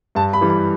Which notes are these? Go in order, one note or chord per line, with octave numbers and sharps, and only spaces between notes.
G2 A5
B5
E3 G3
B5